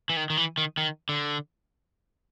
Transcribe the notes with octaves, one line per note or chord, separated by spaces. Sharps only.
E3
D#3
D#3
E3
D#3
D#3
D3